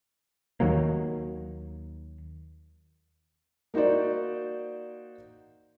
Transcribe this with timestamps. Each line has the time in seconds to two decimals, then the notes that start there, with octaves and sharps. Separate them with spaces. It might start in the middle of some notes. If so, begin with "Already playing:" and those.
0.60 D#2 D#3 F#3 A#3
3.74 A#3 D#4 F#4 C5 D5